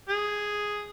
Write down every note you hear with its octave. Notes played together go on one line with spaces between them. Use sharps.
G#4